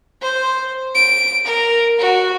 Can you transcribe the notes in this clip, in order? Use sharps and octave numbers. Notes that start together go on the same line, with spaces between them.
C5
D7
A#4
F#4